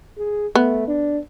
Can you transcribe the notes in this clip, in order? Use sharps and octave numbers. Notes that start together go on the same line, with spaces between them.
G#4
A3 B3
D4